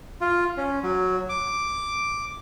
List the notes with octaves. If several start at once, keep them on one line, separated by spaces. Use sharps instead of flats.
F4
C#4
F#3
D6